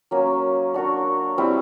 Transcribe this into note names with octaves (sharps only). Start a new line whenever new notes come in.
F#3 A#3 C#4
D4 F#4 A#4
G3 C4 E4